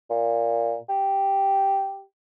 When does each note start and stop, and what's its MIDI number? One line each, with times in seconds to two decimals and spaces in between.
0.10 0.76 46
0.89 2.03 67